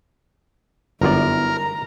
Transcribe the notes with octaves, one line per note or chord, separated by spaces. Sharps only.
G1 F#2 B3 E4 A#4 D5
A#5